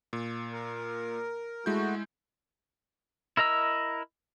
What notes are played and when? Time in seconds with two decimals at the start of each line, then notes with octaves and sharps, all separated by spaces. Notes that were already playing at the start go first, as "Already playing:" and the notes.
0.13 A#2
0.52 A#4
1.66 G#3 A3 E4 F#4 G6
3.37 E4 A#4 D#5 A#5 E6